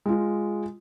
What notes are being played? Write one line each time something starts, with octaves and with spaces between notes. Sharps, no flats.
G#3 F4